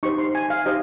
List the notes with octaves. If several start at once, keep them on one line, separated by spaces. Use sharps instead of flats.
D#4 G4 C5 C#6
C6
G#5
F5
D#4 G4 C5 D#5